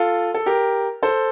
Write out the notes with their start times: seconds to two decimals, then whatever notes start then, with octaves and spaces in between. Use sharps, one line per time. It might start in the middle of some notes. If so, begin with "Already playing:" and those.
Already playing: F4 A4
0.34 A4
0.46 G4 A#4
1.03 A4 C5